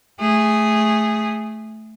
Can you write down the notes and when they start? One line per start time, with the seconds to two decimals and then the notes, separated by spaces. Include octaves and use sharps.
0.20 A3 G#4